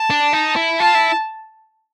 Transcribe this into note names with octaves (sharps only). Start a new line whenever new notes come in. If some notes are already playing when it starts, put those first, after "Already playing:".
Already playing: A5
D4
D#4
E4
F4 A5
E4